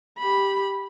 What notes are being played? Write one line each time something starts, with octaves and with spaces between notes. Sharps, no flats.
G4 B5